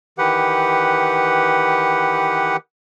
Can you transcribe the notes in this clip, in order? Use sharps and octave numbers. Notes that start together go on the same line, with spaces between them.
D#3 E3 G4 B4 F#5